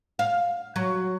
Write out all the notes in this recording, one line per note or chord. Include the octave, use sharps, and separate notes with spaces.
F5
F#3